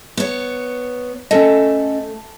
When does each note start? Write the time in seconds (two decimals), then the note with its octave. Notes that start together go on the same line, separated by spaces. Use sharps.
0.17 B3 C#5
1.31 A3 C#4 A4 D#5